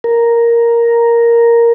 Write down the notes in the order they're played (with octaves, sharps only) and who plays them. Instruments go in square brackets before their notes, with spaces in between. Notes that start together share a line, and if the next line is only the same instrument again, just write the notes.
[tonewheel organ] A#4